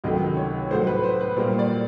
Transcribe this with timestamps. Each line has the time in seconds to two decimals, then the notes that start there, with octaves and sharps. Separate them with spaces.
0.04 C#2 C3 D#3 F#3 A3 D#5
0.37 C#5
0.70 A2 F#3 A3 C5
0.82 C5
0.87 B4
1.04 C5
1.21 B4
1.37 A#2 G3 A#3 C5
1.59 D5